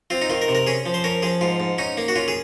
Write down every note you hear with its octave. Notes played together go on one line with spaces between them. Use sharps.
C4 F4
D#4
D#3 F4
A#4
C3
A#4
C#4 G#4
F3
C5
C#4 A#4
F3 G#4
G#2 F4
G#2
C#4 D#4
A#3
F#4
C#4 F4
G#4